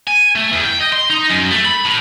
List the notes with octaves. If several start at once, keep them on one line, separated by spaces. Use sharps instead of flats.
G#5
A3
E2
G5
D#5
C6
D#4
F#2
A3
B5
A2